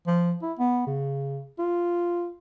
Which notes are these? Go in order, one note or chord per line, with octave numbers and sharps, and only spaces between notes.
F3
E4
B3
C#3
F4